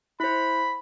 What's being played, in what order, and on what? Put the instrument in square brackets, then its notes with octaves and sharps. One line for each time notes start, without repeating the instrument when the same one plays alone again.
[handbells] E4 C5 [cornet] B5